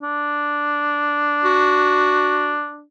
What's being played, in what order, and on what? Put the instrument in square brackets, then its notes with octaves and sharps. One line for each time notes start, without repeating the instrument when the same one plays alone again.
[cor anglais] D4
[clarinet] F#4